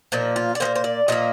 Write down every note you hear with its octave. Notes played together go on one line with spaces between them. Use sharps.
A#2 F3 A#3 D#4
F4
D5
F3 A#3 C5
A#2
C5
D5
A#2 F3 A#3 D#5